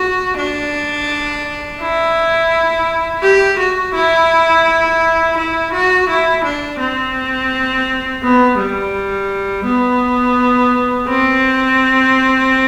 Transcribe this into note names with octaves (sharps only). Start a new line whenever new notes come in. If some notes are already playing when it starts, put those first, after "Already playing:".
Already playing: F#4
D4
E4
G4
F#4
E4
E4
F#4
E4
D4
C4
B3
G3
B3
C4